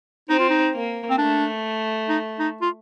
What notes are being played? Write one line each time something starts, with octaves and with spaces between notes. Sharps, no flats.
C4 D#4
F4
D#4
A#3
C4
A3 D4
D#4
D#4
F4